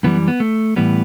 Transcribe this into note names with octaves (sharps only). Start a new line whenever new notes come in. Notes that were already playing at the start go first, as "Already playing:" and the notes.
F#2 E3 G3 B3
B3
A3
A2 E3 G3 B3